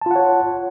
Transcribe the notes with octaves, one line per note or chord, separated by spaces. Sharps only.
F4 C#5 F#5 A5